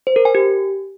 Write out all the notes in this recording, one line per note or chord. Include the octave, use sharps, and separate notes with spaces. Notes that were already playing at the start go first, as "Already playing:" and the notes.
C5
A#4
G#5
G4